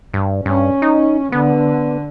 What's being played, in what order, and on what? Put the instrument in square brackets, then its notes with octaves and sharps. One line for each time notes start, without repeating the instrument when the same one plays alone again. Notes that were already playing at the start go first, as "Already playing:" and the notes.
[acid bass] G2
[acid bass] G2 [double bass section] C#4
[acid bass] D#4
[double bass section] D3 [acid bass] B3